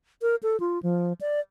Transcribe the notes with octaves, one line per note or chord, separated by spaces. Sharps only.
A#4
A4
F4
F3
D5